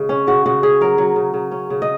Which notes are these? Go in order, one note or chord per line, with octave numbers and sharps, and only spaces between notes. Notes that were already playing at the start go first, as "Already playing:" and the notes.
Already playing: C#3 G#3
C#4
C#3 F#4
C#3 F#4
C#4 G#4
F#3 A#4
F#3
C#3
C#3
C#4
C#3
D#5